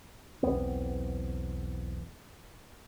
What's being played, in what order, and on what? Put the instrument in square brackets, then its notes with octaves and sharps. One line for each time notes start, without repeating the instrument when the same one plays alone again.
[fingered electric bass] B1 E2 B3 C4